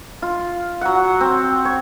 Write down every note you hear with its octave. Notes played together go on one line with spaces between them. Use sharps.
F4
F#3 F#5
C4
C#5